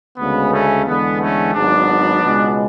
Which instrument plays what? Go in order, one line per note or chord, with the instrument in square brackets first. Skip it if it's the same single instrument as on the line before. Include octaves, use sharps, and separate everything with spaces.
[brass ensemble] D2 C#3 G#3 B3
A3 C#4
E2 D3 G#3 B3
A3 C#4
G#1 G#2 F#3 B3 D4
C#2 B2 G#3